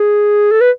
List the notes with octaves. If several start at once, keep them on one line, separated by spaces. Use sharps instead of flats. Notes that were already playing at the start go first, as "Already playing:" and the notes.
Already playing: G#4
A4
B4